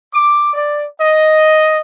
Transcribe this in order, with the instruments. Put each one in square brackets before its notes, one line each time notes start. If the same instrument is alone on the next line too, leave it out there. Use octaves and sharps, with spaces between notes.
[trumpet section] D6
D5
D#5